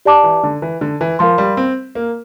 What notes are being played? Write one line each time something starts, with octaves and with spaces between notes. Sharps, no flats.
G4 D5 A5 D6
E3
D3
E3
D3
E3
F3 A#4 F5 C6
G3
C4
A#3